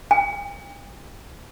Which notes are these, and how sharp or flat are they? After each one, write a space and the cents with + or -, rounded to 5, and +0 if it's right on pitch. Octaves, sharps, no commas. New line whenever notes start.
G5 +40